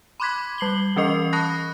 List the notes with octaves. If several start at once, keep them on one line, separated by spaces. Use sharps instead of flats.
B5 C6 D6 F#6 G#6 B6
G3 C7 F#7 G7
E3 C#4 A#4 D#5 C#6 C7
A5 B5 C#6 D#6 F#6 A#6